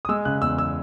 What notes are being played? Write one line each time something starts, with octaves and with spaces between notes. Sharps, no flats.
D#6
G#3 E6
C#3 F#6
E2 E6
E6